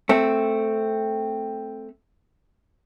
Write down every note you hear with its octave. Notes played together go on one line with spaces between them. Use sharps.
A3 C4